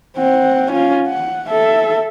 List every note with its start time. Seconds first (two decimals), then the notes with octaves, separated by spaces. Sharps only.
0.18 C4 F#5
0.72 C#4 F4
1.08 F#5
1.50 A4 E5